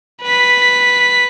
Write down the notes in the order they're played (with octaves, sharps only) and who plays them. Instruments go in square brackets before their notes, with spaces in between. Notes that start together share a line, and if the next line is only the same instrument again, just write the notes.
[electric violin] B4 B6